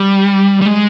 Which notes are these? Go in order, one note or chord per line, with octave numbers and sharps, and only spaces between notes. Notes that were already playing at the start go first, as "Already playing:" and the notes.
Already playing: G3
G3
G#3